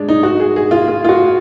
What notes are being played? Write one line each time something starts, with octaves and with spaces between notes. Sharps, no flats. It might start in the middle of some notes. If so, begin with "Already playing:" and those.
Already playing: G#3 D4
D#4
F#4
G#4
G#4
F4
F4
F4
F#4